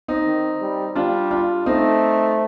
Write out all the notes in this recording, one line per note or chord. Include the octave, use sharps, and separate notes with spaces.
C4 D#4
D#3
G3
G3 D4 F4
D4 F4
A3 C4 D#4